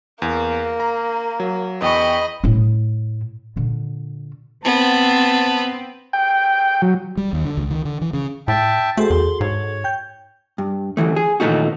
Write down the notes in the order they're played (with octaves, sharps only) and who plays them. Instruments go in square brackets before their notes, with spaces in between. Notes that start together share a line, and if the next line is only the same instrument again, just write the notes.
[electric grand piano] E2 [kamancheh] A#3
[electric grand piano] A#5
F#3
[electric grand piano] E2 G5 C#6 [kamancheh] D#5 B5
[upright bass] A2 E4
A#2 D3
[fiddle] B3 [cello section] C4 [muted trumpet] A5
[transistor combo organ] G5
F#3
[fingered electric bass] G3
D#2
D3
C#2
D#3
D3
E3
C#3
[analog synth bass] A2 [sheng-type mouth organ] E5 G5 A5
[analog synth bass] A3 [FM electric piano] F#4 G#4 A4 [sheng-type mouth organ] C5
[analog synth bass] E2 [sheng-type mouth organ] C6
[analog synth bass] G#2 [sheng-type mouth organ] C#5
[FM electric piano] G5 G6
[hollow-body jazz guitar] G2
D2 G2 E3 A3
G#4
A#2 D#3 E3 A3 D#4 F#4